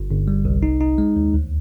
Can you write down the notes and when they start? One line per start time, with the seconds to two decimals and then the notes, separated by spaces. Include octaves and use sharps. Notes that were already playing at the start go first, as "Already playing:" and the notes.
Already playing: G1
0.10 G1
0.28 G3
0.45 C2
0.63 D#4
0.80 D#4
0.98 G#3
1.16 D#2
1.34 D2